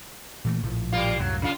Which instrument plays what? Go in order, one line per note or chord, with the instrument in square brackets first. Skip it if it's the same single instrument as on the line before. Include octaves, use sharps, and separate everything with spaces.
[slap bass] A#2 E3 A3
A#1 A2 F3
[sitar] G3 A#3 F4
[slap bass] C2 F#2 A2 [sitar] F#3
[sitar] C#3 F4